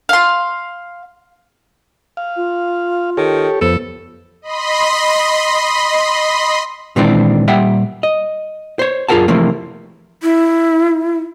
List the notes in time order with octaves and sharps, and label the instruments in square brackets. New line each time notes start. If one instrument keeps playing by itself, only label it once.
[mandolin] F5 C6
[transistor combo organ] F5
[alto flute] F4
[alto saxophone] D#3 [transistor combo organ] G4 A4 C#5
[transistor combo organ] F2 B3 [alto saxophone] A4 [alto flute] C5
[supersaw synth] D#5 B5 C6
[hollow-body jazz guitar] A#2 D#3 E3 G#3 C4 D4
A#2 G3 E5 F#5 G5
D#5
C5 C#5
F#2 F4 G#4 A#4 F#5 A5
C3 E3 F3 A3 A#3
[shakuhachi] E4